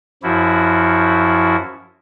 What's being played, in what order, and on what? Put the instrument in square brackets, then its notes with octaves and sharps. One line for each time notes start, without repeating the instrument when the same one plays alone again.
[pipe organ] F#2 F3 E4 F#4